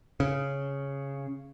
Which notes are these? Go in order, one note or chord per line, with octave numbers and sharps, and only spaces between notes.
C#3